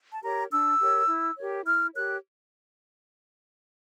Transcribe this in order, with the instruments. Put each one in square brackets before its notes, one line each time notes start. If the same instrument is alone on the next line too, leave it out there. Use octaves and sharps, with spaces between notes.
[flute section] A5
G4 A#4 C#5 A#5
D4 E6
G4 A#4 C#5
E4
G4 A#4 C#5
E4 F6
G4 A#4 C#5 F#6